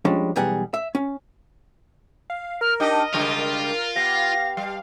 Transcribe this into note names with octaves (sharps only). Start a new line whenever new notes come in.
F3 G3 G#3 C#4 D4
B1 E2 G3 G#4 F#5
E5
C#4
F5
A#4 F6
D4 D#4 G4 D#5
C#3 G3 G#3 F4
B3 G4 F5 A#6
G3 F5